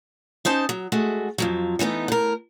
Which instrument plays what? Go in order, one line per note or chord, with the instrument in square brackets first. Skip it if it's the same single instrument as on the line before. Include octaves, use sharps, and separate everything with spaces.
[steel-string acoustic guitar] C#4 D#4 C5 A5
F#3
G#3 A3 F#4
F2 F3 F#3
E3 A3 B3 D#4
A2 A#4